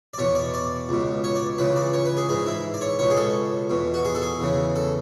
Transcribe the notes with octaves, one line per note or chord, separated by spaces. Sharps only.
D5
E2 B2 C#5
D5
D5
C#2 B2
C#5
D5
C#2 C#3 E3 B4
D5
C#5
B4
G#4
G#2 E3 G#4
E4
D5
C#5
C#2 B2 C#5
G#4
A4
E2 B2
F#4
G#4
A4
G#4
E2 C#3 E3
A4